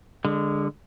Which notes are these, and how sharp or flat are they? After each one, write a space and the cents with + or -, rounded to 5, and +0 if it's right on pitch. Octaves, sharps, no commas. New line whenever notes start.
D3 +0 G#3 -20